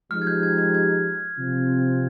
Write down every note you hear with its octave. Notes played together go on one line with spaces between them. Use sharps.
F3 G#3 D#4 G4 F6
G#6
G6
G#6
G#6
G#6
C3 F3 C4